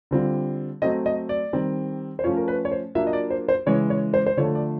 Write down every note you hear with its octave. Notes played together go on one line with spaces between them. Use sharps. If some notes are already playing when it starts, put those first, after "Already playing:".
D3 G3 C4 F4
F#3 A3 C4 D#5
D#5
D5
D#3 G3 C4
C5
F3 A3 C#4 F4 C#5
A#4
B4
C#5
C5
F#3 A#3 D4 F4 E5
D#5
D5
C5
C5
C#3 E3 G#3 C#5
C#5
C5
C5
D3 F3 A3 C#5
D5